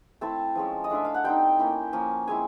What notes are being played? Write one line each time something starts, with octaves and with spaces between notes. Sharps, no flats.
A3 C4 E4 A5
F3 G#3 C#4
D#5
A3 D4 F4 E5
F5
F#5
G3 C4 D#4 G5
A#3 C#4 E4
F3 A#3 C#4
G#3 C4 E4 G#5